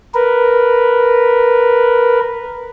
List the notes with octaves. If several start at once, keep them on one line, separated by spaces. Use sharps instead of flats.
A#4 B4